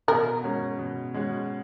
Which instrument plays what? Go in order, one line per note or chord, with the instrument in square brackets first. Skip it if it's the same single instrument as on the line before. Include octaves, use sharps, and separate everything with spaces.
[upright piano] B2 [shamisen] A#4
[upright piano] G#3 C#4 F#4
B2
G#3 C#4 F#4